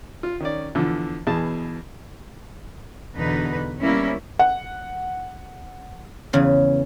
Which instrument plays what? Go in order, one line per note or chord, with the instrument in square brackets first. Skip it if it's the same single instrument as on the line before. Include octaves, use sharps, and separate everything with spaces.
[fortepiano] F4
D#3 C#4 D5
E2 D3 F3
E2 B2 G#4 A5
[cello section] E2 B2 D3 D#4 B4
G3 A#3 B3 C#4 E4
[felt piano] F#5
[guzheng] E2 C#3 B4